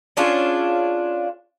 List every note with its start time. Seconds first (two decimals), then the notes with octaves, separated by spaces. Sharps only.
0.17 C#4 D4 F4 G#4